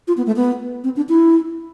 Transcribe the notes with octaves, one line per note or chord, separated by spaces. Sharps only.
F4
B3
A3
B3
C4
D4
E4